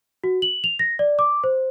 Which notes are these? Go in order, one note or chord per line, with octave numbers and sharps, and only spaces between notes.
F#4
F#7
F7
A#6
D5
D6
C5